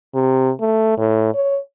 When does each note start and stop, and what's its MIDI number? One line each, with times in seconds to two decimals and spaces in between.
0.15 0.50 48
0.61 0.94 57
0.98 1.33 45
1.34 1.58 73